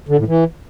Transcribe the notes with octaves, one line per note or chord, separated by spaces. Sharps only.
D3
A2
E3